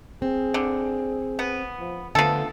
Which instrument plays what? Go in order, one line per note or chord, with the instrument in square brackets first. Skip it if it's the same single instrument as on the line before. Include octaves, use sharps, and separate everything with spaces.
[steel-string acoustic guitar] C4 [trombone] G#4
[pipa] D3
B3
[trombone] F3
[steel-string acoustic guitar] D3 B3 [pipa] F3 A4 [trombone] A3